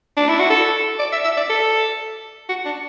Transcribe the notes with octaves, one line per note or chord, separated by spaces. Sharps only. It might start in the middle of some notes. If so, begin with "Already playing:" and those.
D4
E4
F#4
A4
D5
E5
E5
D5
A4
F#4
D4